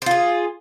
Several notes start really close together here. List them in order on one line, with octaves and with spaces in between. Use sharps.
C5 F4 G#4